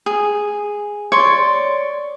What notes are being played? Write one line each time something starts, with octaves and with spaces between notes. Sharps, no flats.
G#4
C#5 D5 C6